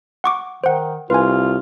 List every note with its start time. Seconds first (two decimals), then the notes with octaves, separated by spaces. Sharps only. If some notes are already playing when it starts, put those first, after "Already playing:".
0.24 F#5 C#6 D6
0.64 D#3 C5 F#5
1.10 C2 F4 B4 G#5